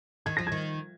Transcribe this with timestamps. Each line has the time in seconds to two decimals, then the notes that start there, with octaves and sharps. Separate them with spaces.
0.26 D#3 G#6
0.37 F3 A#6
0.47 D#3 G#6